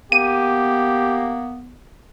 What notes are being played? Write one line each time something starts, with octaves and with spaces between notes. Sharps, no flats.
A#3 B3 G4 D#7